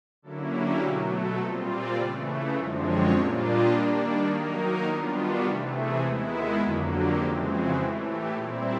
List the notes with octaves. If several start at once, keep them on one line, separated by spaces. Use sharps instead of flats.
D3 F#3 A#3 C#4 E4 A4
G4
B2 F#3 A3 G#4
A4
A#2 G3 C4 F4 D#5
D5
C#3 E3 A3
F#2 D3 F3 G#3 C4 C#5
C#5
A#2 G3 A#3 D4 F4
D#5
D#3 G3 A#3 D4
D#3 F#3 A#3 D#4 A#4
D#3 G3 B3 D4 F4
F#4
C3 E3 A3 G4
G#4
D#2 D#3 G#3 B3 E4
F2 D3 F#3 A#3
G4
F2 C#3 E3 G#3 C4 G4
F#4
A2 E3 A3 G4
G4
A#2 G3 C4 E4 G#4